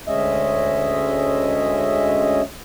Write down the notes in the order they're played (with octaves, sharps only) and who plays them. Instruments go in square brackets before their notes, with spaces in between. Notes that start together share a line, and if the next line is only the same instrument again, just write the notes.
[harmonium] D2 G#3 C#4 D#5 E5